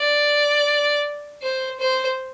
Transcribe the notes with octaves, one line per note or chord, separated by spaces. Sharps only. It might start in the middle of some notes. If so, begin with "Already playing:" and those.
Already playing: D5
C5
C5